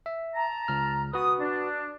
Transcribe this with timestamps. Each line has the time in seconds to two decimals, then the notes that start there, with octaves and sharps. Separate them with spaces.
0.06 E5
0.35 A5 A#5
0.68 C#2 F6
1.13 F#4 B4 D#6
1.39 D4